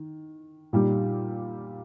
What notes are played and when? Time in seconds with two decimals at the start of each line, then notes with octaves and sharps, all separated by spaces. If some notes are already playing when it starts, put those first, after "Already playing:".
Already playing: D#3
0.73 A#2 G3 D#4 G4